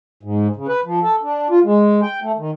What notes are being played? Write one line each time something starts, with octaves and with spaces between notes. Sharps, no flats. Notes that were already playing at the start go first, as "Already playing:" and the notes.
G#2
C#3
B4
F3
A4
D4
F4
G#3
G5
A3
D#3